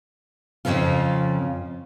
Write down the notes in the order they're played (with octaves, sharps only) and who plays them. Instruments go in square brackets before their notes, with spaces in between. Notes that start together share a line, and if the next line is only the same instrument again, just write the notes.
[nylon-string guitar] F2 A#2 C#3 F3 C4 F4